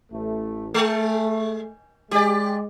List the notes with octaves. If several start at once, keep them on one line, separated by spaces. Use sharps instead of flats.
A1 A3
G#3 A3
G#3 G4 D5